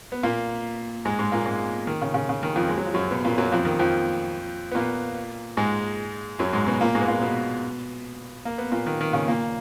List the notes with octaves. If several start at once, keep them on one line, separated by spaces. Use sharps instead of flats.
B3
A#2 A#3
G#2 G#3
G#2 G#3
A#2 A#3
G#2 G#3
D#3
C#3
C#3
C#3
D#3
F2 F3
G#3
F#3
F3
F#2 F#3
B2 B3
A#2 A#3
F#2 F#3
F2 F3
D#3
F2 F3
B3
A#2 A#3
G#2 G#3
F#2 F#3
G#2 G#3
B2 B3
A#2 A#3
G#2 G#3
B3
A#2 A#3
B2 B3
A#3
B3
A#2 A#3
D#3
D#3
C#3
A#2 A#3